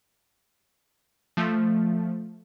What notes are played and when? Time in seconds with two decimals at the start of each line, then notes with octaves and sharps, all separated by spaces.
1.37 F3 A3